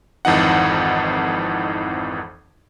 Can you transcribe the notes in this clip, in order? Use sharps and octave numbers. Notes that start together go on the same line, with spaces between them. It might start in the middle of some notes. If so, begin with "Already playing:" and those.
G#1 F2 E3 D#4 F#5